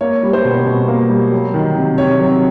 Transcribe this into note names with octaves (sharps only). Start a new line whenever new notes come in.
A#3 C#5
G3
C5
B2
B2
A#3
G3
F#3
D#3
C3
C3 C#5
F#3